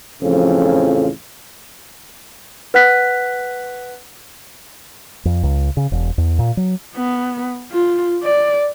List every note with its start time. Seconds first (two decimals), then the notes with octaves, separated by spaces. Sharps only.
0.22 A1 F2 C#3 F3
2.74 B4 F#5 F#6 B6
5.25 F2
5.43 C#2
5.77 C#3
5.92 E1
6.18 E2
6.39 A#2
6.57 F#3
6.96 B3
7.71 F4
8.23 D5